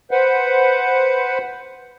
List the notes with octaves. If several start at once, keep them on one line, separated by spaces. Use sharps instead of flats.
B4 C5 F#5